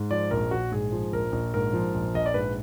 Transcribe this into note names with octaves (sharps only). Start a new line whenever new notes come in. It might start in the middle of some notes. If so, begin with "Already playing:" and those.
Already playing: G#2
F3 D5
A#1 A#4
A#1 F#4
G#2 G#4
F3
A#1 A#4
A#1
G#2 A#4
F3
A#1
A#1 D#5
D5
G#2 B4